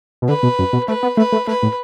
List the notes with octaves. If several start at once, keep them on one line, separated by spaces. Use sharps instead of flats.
B2
D3 B4
B2
F#2
B2
A3 B4
B3
A3 B4
A3
A3 B4
A2